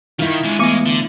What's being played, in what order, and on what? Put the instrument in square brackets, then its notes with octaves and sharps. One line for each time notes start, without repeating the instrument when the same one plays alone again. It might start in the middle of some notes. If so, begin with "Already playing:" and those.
[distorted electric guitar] D#3 [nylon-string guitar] E4 F4
[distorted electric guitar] D3 G#3
[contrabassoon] E2 [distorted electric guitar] G#3 G#5 [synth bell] A3 D6 C#7
[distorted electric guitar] D3